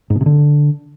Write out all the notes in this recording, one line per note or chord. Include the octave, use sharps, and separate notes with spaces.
G#2
B2
C3
D3